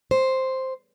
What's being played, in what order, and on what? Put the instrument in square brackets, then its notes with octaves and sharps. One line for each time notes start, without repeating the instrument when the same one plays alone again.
[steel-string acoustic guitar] C5